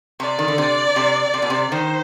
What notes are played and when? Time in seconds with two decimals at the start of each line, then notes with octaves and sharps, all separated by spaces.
0.20 C3 D5
0.39 D#3
0.48 D3
0.58 C3
0.96 C3
1.34 C3
1.42 B2
1.50 C3
1.72 D#3 C5